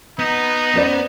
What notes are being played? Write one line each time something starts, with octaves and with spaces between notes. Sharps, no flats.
B3 D#4
C#4 C5 D5